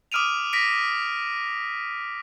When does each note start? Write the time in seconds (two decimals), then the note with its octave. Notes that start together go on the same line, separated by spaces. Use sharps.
0.12 D6 D#6 F6 D7 D#7 F7
0.53 A#6 B6 D7